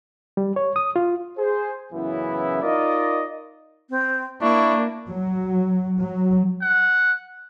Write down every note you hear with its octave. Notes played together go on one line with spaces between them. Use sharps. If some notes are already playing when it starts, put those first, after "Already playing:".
G3
C#5
D#6
F4
G#4 C5
F#2 C#3 E3 B3 E4
D#4 F4 A#4 D5 D#5
C4
A#3 D4 E4 C#6
F#3
F#3
F#5